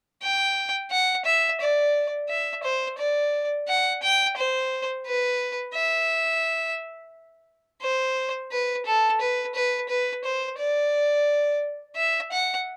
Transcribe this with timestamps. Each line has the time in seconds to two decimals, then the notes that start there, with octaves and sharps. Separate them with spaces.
0.23 G5
0.91 F#5
1.25 E5
1.60 D5
2.29 E5
2.63 C5
2.98 D5
3.68 F#5
4.03 G5
4.37 C5
5.06 B4
5.74 E5
7.82 C5
8.51 B4
8.86 A4
9.21 B4
9.55 B4
9.89 B4
10.24 C5
10.58 D5
11.96 E5
12.32 F#5